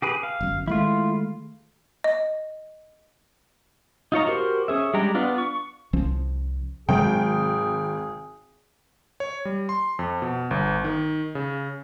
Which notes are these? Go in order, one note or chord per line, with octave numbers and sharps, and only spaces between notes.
G4 G#4 B4
F5
G1 F#2
D#3 G#3 A3 E4 F4
D#5
D#4 F4 C#5 A#5
F#4 G4 A#4 C5
C#4 G#4 E5
G3 G#3 D4 G5 A#5
B3 D4 F4
C#6
C2 F3 C#4
G#1 C3 F#3 G#3 G#4 G5
C#5
G3
C6
F2
B2
G1
D#3
C#3